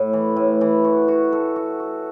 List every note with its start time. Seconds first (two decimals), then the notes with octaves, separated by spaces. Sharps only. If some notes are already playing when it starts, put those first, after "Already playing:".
Already playing: A2
0.13 E3
0.36 A2
0.61 E3
0.84 F#4
1.08 F#4
1.32 A4
1.56 F#4
1.80 F#4